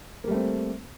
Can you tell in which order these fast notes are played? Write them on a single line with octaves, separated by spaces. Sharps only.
A#3 G3 A3 C4